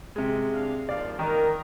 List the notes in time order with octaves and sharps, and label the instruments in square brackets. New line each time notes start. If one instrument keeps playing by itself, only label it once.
[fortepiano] C3 G#3
[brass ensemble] C2 D4 F5
[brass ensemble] D#2 F3 [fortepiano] D5 F5
[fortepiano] D#3 D#5 F#6 [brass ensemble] A#4